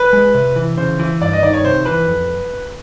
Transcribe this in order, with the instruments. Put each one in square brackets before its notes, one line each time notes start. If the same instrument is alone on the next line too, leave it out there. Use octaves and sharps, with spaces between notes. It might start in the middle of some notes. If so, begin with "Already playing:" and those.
Already playing: [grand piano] B4
[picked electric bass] G#3
C3
E3
[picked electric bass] C#3 [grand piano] C5
[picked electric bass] E3
[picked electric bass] G2 [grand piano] D5
[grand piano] D#5
[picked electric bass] D#3 [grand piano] D5
[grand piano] C#5
[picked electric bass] C3 [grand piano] C5
[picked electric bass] E3 [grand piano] B4
[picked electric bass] F2